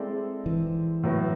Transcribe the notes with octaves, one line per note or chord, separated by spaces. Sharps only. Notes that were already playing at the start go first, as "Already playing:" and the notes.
Already playing: G#3 C4 E4 A4 D5
E3
A2 F#3 B3 E4